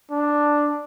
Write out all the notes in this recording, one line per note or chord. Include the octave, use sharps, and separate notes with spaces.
D4